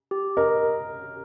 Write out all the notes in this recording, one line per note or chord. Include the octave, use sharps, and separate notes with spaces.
G4
A#4 D#5